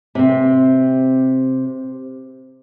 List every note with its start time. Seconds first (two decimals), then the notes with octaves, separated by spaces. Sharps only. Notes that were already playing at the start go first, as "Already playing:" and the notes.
0.15 C3 C4